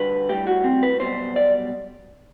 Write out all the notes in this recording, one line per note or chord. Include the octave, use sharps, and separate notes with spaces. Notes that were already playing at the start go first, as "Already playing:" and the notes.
Already playing: D2 D3 G3 B4
A2 G3 G4
F#4
C4
B4
B1 B2 G3 C5
D5